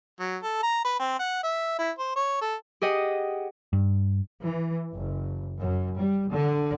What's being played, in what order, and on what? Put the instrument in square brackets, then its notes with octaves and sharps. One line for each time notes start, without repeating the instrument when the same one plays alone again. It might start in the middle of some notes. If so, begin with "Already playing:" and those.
[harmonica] F#3
A4
A#5
B4
C4
F#5
E5
E4
C5
C#5
A4
[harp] G4 G#4 D#5 F#5
[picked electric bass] G2
[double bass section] E3
F#1
F#2
G3
D3